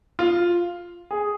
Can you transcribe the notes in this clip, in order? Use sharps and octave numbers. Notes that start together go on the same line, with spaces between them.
F4
G#4